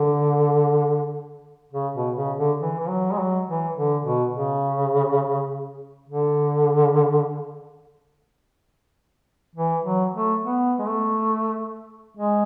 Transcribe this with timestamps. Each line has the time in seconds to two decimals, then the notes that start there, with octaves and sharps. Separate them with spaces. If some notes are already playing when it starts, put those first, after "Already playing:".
Already playing: D3
1.73 C#3
1.95 B2
2.16 C#3
2.38 D3
2.60 E3
2.80 E3
2.89 F#3
3.12 G#3
3.19 F#3
3.47 E3
3.77 D3
4.05 B2
4.35 C#3
6.08 D3
9.56 E3
9.84 F#3
10.14 A3
10.43 B3
10.79 G#3
10.86 A3
12.17 G#3